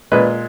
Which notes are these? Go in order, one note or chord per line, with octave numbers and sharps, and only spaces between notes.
A#2 G#3 B4